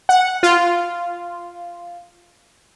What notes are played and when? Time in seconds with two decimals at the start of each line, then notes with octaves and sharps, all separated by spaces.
0.09 F#5
0.43 F4